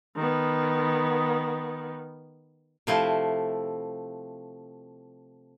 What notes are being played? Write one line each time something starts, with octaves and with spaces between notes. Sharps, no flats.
D#3 B3
C3 F3 A3 E4